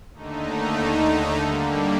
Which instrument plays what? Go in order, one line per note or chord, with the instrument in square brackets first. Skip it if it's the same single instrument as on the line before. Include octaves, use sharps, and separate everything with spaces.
[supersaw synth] D#2 D3 A3 D#4
D3 G3 A#3